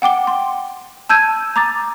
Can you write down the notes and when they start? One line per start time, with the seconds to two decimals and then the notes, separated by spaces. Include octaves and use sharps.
0.02 F#5 G5 D6 G7
0.27 C6
1.09 A5 E6 G6 G#6 D#7
1.56 A#5 D6 A6